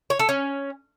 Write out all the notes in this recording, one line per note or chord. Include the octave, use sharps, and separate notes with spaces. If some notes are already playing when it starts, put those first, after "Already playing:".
C#5
A4
C#4